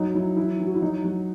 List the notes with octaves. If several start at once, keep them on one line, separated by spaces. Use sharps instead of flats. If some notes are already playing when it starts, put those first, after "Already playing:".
Already playing: F#3 D#4
F#3 E4
E3 E4
E3
F#4
E4
F#3 D#4
F#3